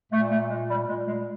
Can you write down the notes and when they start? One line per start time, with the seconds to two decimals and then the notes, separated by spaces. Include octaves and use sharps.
0.12 A#2 A3
0.30 A3
0.50 A#2 G#3
0.69 G3
0.88 A#2 G#3
1.07 G#3